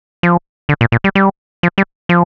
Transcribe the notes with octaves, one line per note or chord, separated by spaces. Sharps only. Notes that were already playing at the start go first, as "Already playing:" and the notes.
F3
D3
A#2
A#2
G3
G3
F3
G3
F3